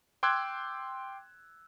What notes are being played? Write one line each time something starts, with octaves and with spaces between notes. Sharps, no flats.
G5 C6 D6 E6 F#6 G#6